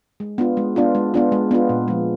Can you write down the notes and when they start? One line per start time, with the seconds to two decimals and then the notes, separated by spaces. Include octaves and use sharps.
0.20 G#3
0.38 B3 D4 F4
0.57 G#3
0.76 B3 D4 F4
0.95 G#3
1.14 B3 D4 F4
1.32 G#3
1.51 B3 D4 F4
1.69 A#2
1.88 F3 G#3